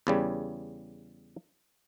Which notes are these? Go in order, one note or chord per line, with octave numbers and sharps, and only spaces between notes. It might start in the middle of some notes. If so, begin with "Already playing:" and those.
E2 C#3 G3